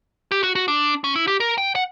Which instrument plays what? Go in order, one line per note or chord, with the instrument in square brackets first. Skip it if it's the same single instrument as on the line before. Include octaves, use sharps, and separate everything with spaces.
[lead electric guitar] G4
F#4
F#4
D4
C#4
E4
G4
A#4
G5
F#5